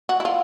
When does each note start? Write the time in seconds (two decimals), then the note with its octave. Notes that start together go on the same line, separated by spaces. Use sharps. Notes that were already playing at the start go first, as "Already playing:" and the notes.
0.09 F#4
0.20 E4
0.25 F4